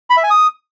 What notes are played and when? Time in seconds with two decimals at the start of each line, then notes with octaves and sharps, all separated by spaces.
0.10 B5
0.17 E5
0.24 G#5
0.30 D#6